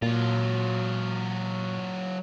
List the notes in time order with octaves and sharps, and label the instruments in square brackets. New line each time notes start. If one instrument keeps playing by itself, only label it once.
[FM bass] A#2 [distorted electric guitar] F#3 F4